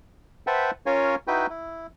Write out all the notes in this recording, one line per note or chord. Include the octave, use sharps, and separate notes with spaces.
B4 C5 E5 F#5 G5 A5
C#4 F4 A#4 C#5 F5 G#5
D#4 E4 F#4 B4 G5
E4